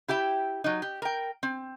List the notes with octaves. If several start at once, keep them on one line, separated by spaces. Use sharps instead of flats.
E4 G4 E5 G5
F#3 D#4
G4
A#4 G5
C4